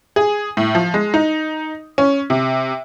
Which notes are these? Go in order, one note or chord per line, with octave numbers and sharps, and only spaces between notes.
G#4
A2
F3
G#3
D#4
C#4
C3